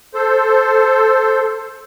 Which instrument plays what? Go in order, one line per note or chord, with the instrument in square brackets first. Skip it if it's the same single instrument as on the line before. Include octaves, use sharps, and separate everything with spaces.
[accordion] A4 C5